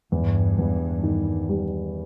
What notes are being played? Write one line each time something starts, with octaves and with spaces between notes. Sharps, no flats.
E2 G2
E2
D#3
G3